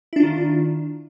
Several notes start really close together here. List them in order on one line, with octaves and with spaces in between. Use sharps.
E4 D4 F4 D#3